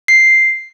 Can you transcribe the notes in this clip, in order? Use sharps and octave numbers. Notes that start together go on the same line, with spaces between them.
C7